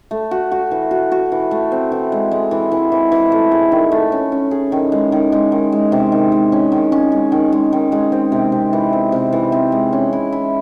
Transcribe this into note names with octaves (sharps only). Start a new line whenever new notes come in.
A3
F#4
F#4
E3
F#4
F#4
E3
A3
C4
E3
G#3
G#3
E3
E3
E3
E3
A3
G#4
D#3
A3
C#4
C#4
G#4
D#3
G#3
D#3
G#3
D#3
G#3
C3
D#3
G#3
C#4
D#3
C#4
G#3
D#3
G#3
D#3
G#3
C4
C3
C3
E3
C4
C3
E3
C4
G#3
C#4
E4
E4